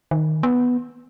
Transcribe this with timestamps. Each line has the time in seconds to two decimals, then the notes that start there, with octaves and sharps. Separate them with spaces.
0.11 D#3
0.43 B3